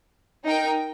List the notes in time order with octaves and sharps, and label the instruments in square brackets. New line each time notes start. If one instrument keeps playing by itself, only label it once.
[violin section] D#4 A#4 G5